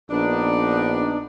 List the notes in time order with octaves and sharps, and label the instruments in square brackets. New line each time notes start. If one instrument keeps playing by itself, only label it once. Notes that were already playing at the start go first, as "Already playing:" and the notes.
[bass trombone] A#1 [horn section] B3 D4 D#4